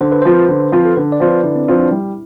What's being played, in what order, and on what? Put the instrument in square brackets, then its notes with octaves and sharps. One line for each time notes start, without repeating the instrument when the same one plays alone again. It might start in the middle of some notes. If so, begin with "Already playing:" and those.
[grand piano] D3 [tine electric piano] C5
[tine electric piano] B4
[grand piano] F3 C4 F4 [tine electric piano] C5
[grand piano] D3
F3 C4 F4
[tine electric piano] A4
[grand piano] D3 [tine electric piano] B4
[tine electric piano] D5
[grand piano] F3 C4 F4
[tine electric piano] B4
[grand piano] D3 [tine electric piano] E4
[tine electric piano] C4
[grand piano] F3 C4 F4 [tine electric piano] D4
[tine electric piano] D4
[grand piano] G3 [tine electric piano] E4